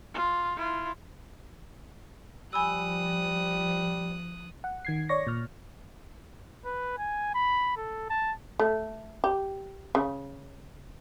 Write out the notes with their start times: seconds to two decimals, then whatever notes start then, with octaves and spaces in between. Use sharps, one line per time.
0.14 F4
0.57 E4 F4
2.53 F3 G3 G#5 B5 D#6 E6 F#6
4.64 F#5
4.85 D#3 G#6 C7
5.09 C#5 D5 C#6 A#6
5.27 A#2 F6
6.65 B4
6.99 G#5
7.35 B5
7.77 A4
8.10 A5
8.59 A3
9.24 G4
9.95 C#3